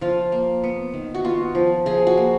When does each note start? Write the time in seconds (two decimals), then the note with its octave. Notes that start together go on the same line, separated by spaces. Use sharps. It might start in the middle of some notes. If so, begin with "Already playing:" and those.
0.01 F3 F4
0.32 A#3
0.64 B3
0.94 D#3
1.14 F#4
1.24 B3 F4
1.55 F3
1.86 F3 G#4
2.07 F#4
2.18 A#3